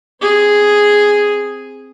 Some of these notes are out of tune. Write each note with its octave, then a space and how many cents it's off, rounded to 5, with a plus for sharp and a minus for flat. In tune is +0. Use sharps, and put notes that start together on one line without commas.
C4 +0 G#4 +0